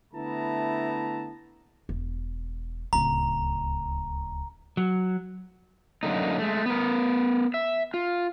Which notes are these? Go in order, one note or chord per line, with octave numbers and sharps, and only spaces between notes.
D3 A3 B3 E4 A5 A#5
E1
D1 C#2 A#5
F#3
F#2 D3 A#3 D#4
G#3 A3
B3 A#4
E5
F4